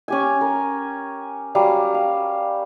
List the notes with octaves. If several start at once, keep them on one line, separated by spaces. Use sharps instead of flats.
C#4 G4 G#5
A#4
F#3 G3 F5
F5